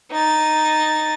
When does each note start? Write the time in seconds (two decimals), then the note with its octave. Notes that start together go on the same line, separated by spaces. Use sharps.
0.12 D#4 A6